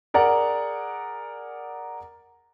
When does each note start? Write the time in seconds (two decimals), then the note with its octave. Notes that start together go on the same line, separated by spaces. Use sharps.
0.14 G#4 A#4 D5 F#5